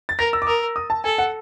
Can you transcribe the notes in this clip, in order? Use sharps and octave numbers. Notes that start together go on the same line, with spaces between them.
A6
A#4 A#6
E6
D6
A#4 D#6
D#6
A5
A4 G#5
F#5